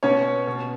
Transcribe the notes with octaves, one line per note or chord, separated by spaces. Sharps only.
B2 C#4 C#5
B2